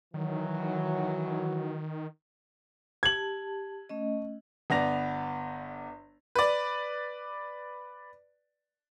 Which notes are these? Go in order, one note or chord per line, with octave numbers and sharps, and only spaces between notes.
D#3 E3 F#3
G4 A5 G#6 F#7
A3 C#4 D#5
G1 B3 D5 A#6 F7
B4 D5